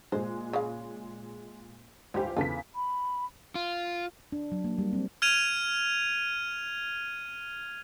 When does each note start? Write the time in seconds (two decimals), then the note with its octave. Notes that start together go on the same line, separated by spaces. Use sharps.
0.12 A#2 G#3 C5
0.53 C#3 F5
2.14 C#2 E3 G3 G4 C5
2.37 E2 C#3 F4 A4 B6
2.75 B5
3.55 F4
4.32 D4
4.52 F#3
4.64 A#3
4.78 G3
4.93 C4
5.22 F6 G#6 D#7 F7